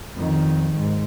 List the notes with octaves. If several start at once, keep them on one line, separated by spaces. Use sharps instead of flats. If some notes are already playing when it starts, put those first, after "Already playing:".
F2 D#3
G#2